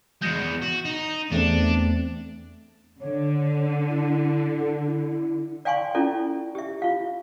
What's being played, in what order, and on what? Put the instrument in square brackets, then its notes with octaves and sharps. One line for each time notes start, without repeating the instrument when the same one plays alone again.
[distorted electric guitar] E2 G#3 [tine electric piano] G6 A#6 C#7
[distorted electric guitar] E2
F#4
D#4
[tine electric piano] E2 A3 C4 [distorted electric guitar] D4
[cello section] D3 [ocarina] C#5
[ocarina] E4
A4
E4
[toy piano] D5 F5 G5 G#5 C6 C#6
C#4 E4 F4 A4 D5
G4 E5
F4 F5